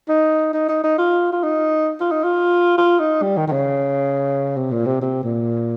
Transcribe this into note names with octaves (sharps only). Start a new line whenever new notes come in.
D#4
D#4
D#4
D#4
F4
F4
D#4
F4
D#4
F4
F4
D#4
G3
D#3
D#3
C#3
C3
A#2
C3
C3
A#2